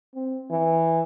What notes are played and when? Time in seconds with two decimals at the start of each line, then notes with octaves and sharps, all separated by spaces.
0.15 C4
0.51 E3